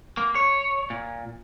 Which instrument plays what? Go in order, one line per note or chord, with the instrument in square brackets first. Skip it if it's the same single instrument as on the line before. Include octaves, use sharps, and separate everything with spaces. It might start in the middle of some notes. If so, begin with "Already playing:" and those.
[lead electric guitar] A#3
C#5
A#2